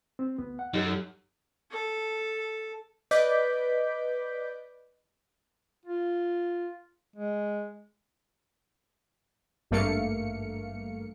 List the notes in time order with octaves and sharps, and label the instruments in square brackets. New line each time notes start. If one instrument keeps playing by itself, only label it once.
[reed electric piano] C4
D2 B3
F#5
[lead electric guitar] F#2 [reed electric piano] D#4 G4 A4
[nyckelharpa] A4
[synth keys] B4 D5 D#5 D6 G6 B6
[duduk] F4
G#3
[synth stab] G#1 G2 A3 A#3 F5 C#7